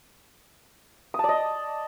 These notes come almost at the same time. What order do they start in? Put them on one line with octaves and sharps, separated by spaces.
D#6 A5 D5 D#5